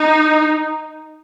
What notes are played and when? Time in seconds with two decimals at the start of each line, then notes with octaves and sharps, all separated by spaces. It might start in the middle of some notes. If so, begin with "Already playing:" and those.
Already playing: D#4